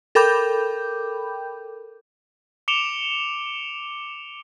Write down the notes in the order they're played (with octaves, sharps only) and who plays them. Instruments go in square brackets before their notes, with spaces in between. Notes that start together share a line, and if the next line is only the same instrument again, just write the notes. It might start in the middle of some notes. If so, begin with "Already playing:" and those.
[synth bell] A4 A#4 G5 B5 D6 G6
[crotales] D6 C#7 D7 E7 F7 G7